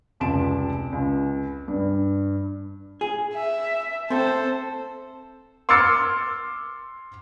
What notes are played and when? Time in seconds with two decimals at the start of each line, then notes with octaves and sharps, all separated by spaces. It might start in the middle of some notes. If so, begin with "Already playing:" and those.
0.20 F1 C#2 A5 C6 D7 E7
0.92 C#2
1.68 G2
3.01 G#4
3.33 E5
4.10 C4 A4 C5 A5
5.69 C6 D6 E6 F6 A6 C#7